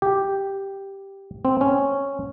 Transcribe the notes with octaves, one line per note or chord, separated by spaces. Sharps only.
G4
C4
C#4